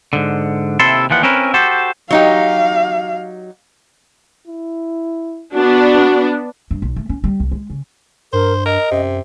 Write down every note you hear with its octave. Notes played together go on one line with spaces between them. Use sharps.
G#2 D3
D#2 C3 E4 A4 C6
D#2 E3 F3 F#5
C4 C#4 E4 A#4 B4
F#4 G4 A4 C5
F#3 D#4 G4 F5
E4
B3 D4 F#4
G2
B1
A3
C#4
G3
C2
G#3
C#3
G2 A#4 C5
A#4 D#5
F#2 C3